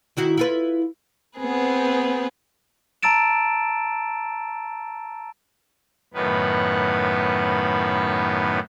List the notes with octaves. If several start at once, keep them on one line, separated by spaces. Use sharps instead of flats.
D#3 E4 F#4
E4 F4 B4
B3 C4 G#4 B4
A5 A#5 E6 A6 D7 E7
F#2 A2 D#3 B3 B4